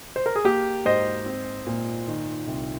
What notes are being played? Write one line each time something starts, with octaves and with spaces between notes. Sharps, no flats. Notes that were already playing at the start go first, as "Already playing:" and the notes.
C5
A#4
G#4
A#3 G4
G#2 C5 D#5
C4
A#2
D#3
C2